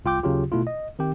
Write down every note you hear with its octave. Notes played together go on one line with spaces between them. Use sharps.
C2 F4 G5 D6 G6
D#2 C#3 F#3 F4 G4
B2 A3 E4 F4
D#5
D#3 C4 G4 G5